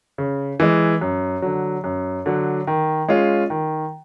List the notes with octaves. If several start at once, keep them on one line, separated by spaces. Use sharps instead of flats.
C#3
E3 G#3
F#2
D3 F#3
F#2
D3 F#3
D#3
G#3 C#4 F4
D#3